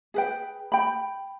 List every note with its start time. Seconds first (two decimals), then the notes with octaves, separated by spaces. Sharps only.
0.14 G#4 B4 G5
0.72 G5 B5